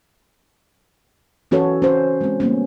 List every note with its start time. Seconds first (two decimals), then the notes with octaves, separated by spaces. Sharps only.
1.51 E3 C#4 F#4 A4 B4 C#5
1.82 C#4 C5
2.21 G#3 C4
2.40 G3 A#3 B3 C#4